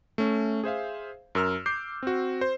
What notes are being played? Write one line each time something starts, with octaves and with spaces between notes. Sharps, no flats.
A3 C#4
G#4 C5 E5 F5
F#2 A#4 E6 F6
D6 G6 C7
C4 F#4
C5